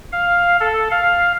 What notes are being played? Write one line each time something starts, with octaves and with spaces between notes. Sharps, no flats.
F5
A4
F5